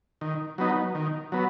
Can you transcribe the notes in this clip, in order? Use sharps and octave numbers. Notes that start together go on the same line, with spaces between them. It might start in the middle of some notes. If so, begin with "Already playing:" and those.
D#3
F#3 B3 D#4
D#3
F#3 B3